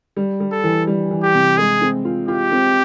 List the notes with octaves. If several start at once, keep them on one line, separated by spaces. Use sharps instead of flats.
G3
G3
A4
E3
G3
E3
G4
C3
G#3 G#4
C4
F4
F4 G4
C4